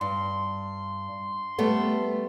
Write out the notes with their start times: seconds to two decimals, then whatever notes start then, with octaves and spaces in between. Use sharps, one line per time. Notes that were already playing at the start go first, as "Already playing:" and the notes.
0.01 G2 C6
1.58 G3 A3 B3